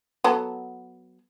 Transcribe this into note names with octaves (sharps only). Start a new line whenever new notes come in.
F#3 B3 A4